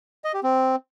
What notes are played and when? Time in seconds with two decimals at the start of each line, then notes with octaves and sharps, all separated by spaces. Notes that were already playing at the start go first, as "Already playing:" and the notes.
0.24 D#5
0.34 G4
0.43 C4